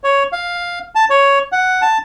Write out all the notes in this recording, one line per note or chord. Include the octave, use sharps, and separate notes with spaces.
C#5
F5
A5
C#5
F#5
A5